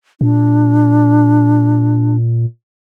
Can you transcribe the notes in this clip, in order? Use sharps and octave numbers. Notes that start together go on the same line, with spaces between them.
A#2 D4